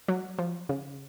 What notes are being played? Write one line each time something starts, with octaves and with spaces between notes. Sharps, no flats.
F#3
F3
C#3